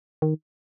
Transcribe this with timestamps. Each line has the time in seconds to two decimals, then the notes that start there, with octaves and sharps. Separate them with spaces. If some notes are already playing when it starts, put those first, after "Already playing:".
0.22 D#3